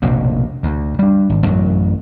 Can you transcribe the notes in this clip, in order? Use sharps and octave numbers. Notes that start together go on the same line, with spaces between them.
F1 A#1 B2
D2
G3 D4
G#1
A1 F#2 F#3